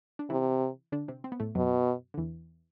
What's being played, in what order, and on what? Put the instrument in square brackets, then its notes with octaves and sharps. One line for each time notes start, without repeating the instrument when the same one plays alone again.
[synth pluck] D4
[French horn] C3 [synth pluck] E3 E4
[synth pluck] D3 D4
C3 C4
C4
B3
A2 A3
[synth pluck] F#2 F#3 [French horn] B2
[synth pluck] D3
E2 E3